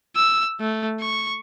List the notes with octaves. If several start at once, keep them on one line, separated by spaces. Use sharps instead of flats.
E6
A3
C#6